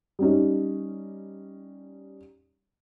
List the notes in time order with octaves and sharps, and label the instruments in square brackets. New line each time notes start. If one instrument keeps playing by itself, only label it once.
[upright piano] G3 C#4 D#4